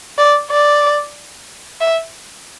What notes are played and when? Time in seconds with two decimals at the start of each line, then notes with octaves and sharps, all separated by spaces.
0.18 D5
0.51 D5
1.81 E5